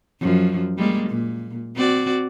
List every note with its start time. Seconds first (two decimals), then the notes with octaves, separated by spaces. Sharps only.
0.20 F#2 F3
0.77 G3 G#3 A#3
1.09 A#2
1.75 C4 F#4 D5